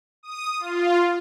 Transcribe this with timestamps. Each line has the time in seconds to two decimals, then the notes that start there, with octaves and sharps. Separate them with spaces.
0.23 D#6
0.59 F4